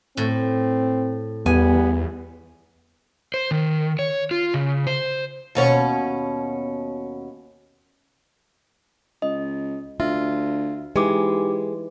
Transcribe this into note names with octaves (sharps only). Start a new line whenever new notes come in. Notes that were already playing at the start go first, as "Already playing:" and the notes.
A2 C4
E2 G3 B3 G#5
C5
D#3
C#5
F4
C#3
C5
D#2 B2 C#4
C#2 D#5
D2 F4 E5
G#2 E3 G#3 G4 D6